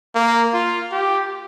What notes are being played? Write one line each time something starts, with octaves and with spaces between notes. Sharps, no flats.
A#3
F4
G4